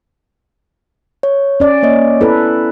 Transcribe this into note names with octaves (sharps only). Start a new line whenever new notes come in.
C#5
C#4 D5
A#3 C#5 D#5
B3 E4 A4 B4